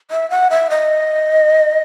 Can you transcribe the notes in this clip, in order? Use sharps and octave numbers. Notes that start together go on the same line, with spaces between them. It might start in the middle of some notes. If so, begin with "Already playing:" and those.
E5
F#5
E5
D#5